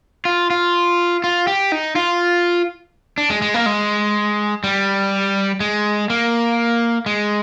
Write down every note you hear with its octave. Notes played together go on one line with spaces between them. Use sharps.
F4
F4
F4
G4
D#4
F4
D4
G#3
G#3
A#3
G#3
G3
G#3
A#3
G#3